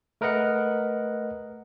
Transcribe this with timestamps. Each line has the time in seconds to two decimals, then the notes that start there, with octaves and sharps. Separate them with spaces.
0.21 A3 A#4 B4 D#5 F#5 F#6